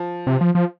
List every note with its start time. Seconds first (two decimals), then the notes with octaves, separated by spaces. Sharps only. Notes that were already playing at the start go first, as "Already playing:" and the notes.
Already playing: F3
0.27 C3
0.41 F3
0.55 F3